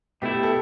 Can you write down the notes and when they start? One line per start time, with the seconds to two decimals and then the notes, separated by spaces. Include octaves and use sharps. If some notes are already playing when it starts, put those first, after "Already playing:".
0.22 B2 A3 E4 G4
0.43 A4